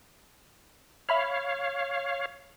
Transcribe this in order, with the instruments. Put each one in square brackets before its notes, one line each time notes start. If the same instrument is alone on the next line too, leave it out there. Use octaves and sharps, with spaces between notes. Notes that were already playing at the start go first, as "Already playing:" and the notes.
[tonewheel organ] C#5 F5 [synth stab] E5 B5 F6